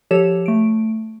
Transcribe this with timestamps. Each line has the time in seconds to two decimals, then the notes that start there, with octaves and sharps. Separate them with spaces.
0.11 F3 G4 A4 C#5 E7
0.46 A3 D7